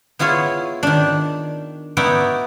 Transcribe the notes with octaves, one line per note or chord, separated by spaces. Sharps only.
B3 E4 F4 G#4 C#5
D#3 D4
B3 D#4 E4 F#4 D5 G5